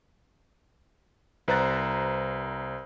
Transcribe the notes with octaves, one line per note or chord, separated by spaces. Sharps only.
C2 B4 C5 A#5 F#6 A6